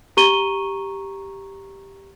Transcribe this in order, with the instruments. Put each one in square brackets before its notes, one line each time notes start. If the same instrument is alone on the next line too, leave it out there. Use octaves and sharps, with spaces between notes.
[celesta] G4 A#5 C#6 D#7 G7